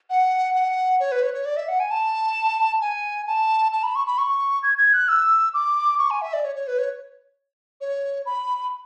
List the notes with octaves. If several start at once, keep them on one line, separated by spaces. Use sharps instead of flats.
F#5
F#5
C#5
B4
C#5
C#5
D5
E5
F#5
G#5
A5
G#5
A5
A5
B5
C#6
B5
C#6
G#6
G#6
F#6
E6
D6
C#6
G#5
E5
D5
C#5
C#5
B4
C#5
C#5
B5